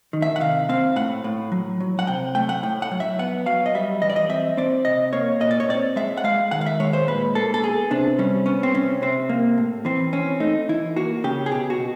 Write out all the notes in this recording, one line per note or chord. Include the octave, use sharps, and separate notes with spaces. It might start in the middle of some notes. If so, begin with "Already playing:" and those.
D#3
E5
F#5
C3 F5
C4 F5
A2 F#5
A2
F#3
F#3
F#5
C3 G5
A3 G5
F#5
A2 G5
F#5
F#3
E5
B3 F#5
F#3 F5
D#5
G3 E5
E3 D#5
D5
D#5
C4 E5
C4 D5
C3 D#5
A#3 C#5
A#2 D#5
D5
C#5
C4 D5
G#3 E5
F#5
G#3 F5
D#3 F#5
F5
E5
G#3 C#5
C5
A#2 B4
A#3 A4
A4
B3 G#4
C3 D4
G3 C#4
B3 C#4
C4
C3 C#4
C3 C4
A#3
A2
E3 C4
C4 C#4
A3 D#4
E3 E4
A#3 F#4
C#3 G4
G#4
B2 G4
F#4
B2